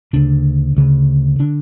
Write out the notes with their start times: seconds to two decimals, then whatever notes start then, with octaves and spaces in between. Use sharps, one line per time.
0.13 D2 C#3 D4
0.77 D2 C#3
1.39 D3 D4